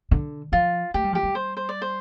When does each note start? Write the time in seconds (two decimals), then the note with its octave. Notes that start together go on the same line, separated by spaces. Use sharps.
0.11 D3
0.52 F3 F4
0.94 A3 G4
1.04 G3
1.13 F3 G4
1.23 G3
1.35 C5
1.57 C5
1.69 D5
1.82 C5